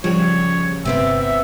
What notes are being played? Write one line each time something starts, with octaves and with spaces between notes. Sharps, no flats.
C#3 F3 G3 G4 C#5
G1 C3 B3 C4 G4 E5
E5